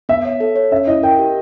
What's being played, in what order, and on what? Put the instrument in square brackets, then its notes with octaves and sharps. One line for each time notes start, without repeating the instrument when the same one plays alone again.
[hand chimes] B3 [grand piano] E5
[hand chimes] C#5
A4
C#5
[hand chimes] C#4 [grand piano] E5
[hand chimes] E4 [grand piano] D#5
[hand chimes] A#4 [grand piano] G5
[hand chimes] G4